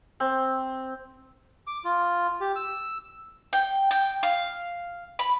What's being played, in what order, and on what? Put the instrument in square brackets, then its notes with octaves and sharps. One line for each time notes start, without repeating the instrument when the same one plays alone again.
[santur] C4
[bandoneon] D6
F4
G4
E6
[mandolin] G5
G5
F5
B5